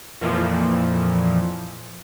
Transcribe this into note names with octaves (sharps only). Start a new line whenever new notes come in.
F2 A#2 E3 F3